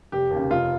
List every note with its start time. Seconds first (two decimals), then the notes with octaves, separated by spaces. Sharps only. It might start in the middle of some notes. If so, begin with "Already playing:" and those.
0.12 F1 G4
0.31 D#2
0.36 C#3
0.50 F1 F4